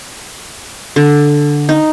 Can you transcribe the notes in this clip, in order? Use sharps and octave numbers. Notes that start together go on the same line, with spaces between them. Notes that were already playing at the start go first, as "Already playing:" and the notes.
D3
D#4